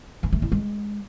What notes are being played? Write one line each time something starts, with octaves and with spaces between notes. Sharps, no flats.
B3
A3
E4
G#3